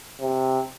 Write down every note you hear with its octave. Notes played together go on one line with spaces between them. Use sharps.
C3